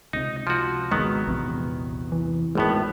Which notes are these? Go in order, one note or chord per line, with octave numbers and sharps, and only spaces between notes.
C#2 C3 D#4
F3 F#4
G#1 D#3 F#3 G#3 B3
A#1 E2 C3
E3
G#1 A2 G#3 B3